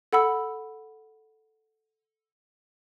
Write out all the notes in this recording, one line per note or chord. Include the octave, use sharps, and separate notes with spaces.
A4 F#5 B5 E6